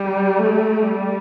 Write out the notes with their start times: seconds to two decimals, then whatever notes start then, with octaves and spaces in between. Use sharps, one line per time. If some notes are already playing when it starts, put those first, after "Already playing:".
Already playing: G3
0.39 A3
0.82 G3